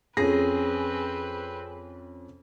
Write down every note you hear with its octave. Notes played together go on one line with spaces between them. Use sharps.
F2 C4 C#4 G#4 B4 A#6